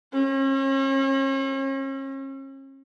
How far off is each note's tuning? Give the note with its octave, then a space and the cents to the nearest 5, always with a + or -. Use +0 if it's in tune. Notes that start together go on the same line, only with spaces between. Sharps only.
C#4 -40